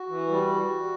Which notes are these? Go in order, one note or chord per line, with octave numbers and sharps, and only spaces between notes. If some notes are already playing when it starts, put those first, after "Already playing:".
Already playing: F#4
E3
G3